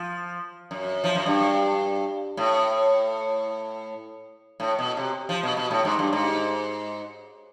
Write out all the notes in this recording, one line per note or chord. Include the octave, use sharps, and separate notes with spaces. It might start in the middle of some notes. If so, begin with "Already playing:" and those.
Already playing: F3
F#2
F3
F#2
G2
A2
A2
B2
C3
F3
B2
B2
A2
G#2
G2
G#2